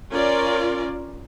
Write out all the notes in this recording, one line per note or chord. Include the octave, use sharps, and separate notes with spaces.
C#4 F4 A#4 D5